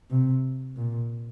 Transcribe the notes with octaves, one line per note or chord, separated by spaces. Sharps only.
C3
A#2